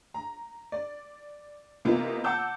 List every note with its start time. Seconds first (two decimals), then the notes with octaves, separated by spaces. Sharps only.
0.14 A#5
0.72 D5
1.85 C3 E3 A#3 B3 D#4 F4
2.24 F#5 A5 D6 E6 G6